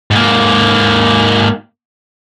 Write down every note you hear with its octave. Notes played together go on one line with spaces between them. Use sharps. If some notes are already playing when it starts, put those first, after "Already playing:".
G#2 A#3